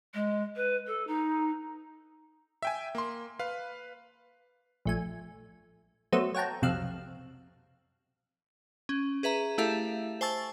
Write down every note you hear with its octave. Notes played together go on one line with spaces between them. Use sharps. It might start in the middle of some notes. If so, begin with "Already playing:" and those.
G#3
B4
A4
D#4
E5 G5 G#5
A#3 C6
B4 F5
A#1 A3 G#5
F#3 A3 B3 C5 D#6 E6
C#5 F#5 G5 A5 A#5
B1 F2 C3 F5 E6 F#6
C#4
G#4 B4 E5 A#5
A3 E4 G4 A4 E5 F5
C5 G#5 A5 C#6 E6 A6